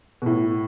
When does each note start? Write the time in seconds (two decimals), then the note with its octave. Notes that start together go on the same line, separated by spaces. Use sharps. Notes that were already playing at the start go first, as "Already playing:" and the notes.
0.22 B2
0.26 A2